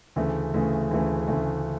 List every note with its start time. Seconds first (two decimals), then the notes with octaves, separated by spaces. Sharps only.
0.16 D2 C#3 E3 A3
0.54 D2 C#3 E3 A3
0.91 D2 C#3 E3 A3
1.28 D2 C#3 E3 A3